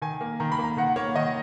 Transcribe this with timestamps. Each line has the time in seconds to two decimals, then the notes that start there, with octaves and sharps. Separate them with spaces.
0.02 D#3 G#5
0.21 A#3
0.40 D#3 A#5
0.52 B5
0.58 A#3
0.64 A#5
0.77 D#3 F#5
0.96 A#3 C#5
1.16 D#3 D#5